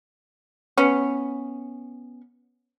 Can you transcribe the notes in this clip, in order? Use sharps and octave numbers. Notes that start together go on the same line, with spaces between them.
B3 C#4